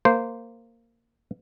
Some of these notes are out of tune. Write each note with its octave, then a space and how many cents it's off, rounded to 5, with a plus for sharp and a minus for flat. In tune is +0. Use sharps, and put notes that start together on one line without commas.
A#3 -15 C5 -10